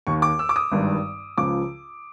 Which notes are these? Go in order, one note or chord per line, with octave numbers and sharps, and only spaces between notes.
D#2 D#3 C#6
D6
E6
D6
D#6
G#1 G2 D#3
C#2 C#3 F3 D6